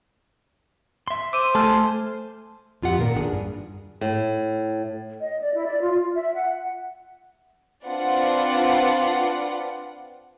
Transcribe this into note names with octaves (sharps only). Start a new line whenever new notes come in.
E5 C6
C5 D6 E6 D#7
A3 G#5 A5 C6 F6
F2 F4 G4 F#5
A#2 D#3 B3 A#4
D4 G4 G#4
G2
A2
D#5
D5
E4
D5
F4
F4
E5
F#5
C4 D4 F4 B4 D5 F#5